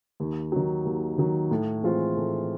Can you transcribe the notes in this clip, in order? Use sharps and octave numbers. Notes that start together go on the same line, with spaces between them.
D#2
D#3 F#3
D#2
D#3 F#3
A2
E3 G#3 C4 F4
A2